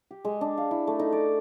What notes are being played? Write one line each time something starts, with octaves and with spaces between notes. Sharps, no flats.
G4
G#3
D4
F5
E4
A3
D#4
D5